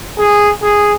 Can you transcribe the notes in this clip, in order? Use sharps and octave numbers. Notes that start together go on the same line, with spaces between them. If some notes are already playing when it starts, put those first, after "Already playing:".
G#4
G#4